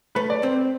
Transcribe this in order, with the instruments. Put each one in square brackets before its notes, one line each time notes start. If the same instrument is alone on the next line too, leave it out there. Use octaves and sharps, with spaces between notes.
[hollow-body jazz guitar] A3 [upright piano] B4
[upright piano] D5
[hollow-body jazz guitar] C4 [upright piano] C5